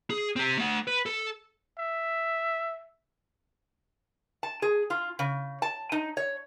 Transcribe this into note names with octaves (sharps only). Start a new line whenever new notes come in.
G#4
C4 G4
A3 F#5
B4
A4
E5
A5
G#4
F4
C#3
A5
D#4
C#5